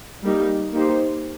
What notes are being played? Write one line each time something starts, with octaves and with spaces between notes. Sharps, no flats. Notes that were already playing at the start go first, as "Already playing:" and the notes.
G3 A#3 D#4 G4
A#3 D#4 G4 C5